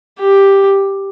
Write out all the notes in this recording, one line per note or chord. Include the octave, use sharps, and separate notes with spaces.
G4